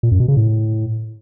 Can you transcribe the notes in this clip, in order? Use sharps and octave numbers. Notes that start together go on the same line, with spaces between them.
A#2
F#2
B2
C#3
A2